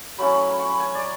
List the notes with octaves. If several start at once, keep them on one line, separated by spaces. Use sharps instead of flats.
F#3 A3 C#4 E4 B5
B5
B5
C#6
B5
G#5
D5